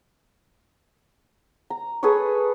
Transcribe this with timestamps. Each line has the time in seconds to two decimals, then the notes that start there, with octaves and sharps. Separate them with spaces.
1.70 A#5
2.03 G#4 A4 B4 C#5